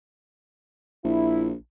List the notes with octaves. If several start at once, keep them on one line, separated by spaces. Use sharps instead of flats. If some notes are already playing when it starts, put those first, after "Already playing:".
A#1 E4